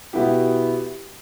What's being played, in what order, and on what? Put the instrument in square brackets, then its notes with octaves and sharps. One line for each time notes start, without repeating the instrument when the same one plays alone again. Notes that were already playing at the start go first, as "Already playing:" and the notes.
[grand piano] B2 B3 E4 G4